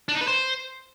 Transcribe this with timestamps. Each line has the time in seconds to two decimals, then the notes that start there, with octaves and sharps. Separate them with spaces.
0.09 D4
0.15 D#4
0.21 B4
0.28 C5